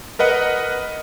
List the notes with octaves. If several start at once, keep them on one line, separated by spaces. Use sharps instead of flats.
A#4 B4 D#5 F#5